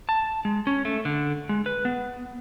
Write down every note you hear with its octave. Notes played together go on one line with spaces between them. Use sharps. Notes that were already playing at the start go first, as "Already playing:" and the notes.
A5
G#3
C#4
A3
D3
G#3
B4
B3